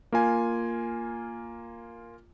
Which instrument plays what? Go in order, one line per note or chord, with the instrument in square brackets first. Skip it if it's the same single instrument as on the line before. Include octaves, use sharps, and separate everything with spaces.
[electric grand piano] A#3 F4 G#5